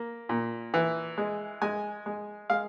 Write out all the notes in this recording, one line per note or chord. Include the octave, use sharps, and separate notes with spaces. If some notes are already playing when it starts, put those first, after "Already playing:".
Already playing: A#3
A#2
E3
G#3
G#3 G#5
G#3
G#3 F5